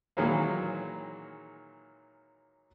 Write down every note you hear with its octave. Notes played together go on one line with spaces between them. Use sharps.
A#2 D#3 E3 F#3 G#3 A#3